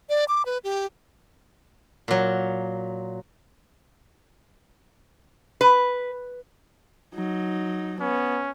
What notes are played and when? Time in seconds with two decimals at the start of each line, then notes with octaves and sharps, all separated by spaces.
0.09 D5
0.28 D6
0.46 B4
0.64 G4
2.08 A#2 F#3
5.61 B4
7.15 F#3 D#4
8.01 B3 C#4